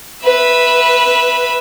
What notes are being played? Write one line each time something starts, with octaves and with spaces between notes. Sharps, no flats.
B4 E5